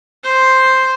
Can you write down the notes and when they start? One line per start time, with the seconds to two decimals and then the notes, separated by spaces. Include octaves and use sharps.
0.23 C5